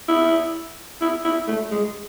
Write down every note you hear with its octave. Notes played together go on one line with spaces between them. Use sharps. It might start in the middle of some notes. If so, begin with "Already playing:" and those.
E4
E4
E4
A3
G#3